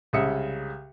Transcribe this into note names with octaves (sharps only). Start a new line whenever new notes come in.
C2 C#3 G#3 E5 D#6 C#7